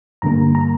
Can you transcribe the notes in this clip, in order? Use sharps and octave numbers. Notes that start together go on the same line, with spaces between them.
G2 D3 G3 A#3 A#5
A#5